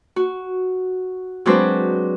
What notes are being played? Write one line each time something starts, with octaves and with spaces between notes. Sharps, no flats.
F#4
F#3 G#3 C4 D4 B4 C5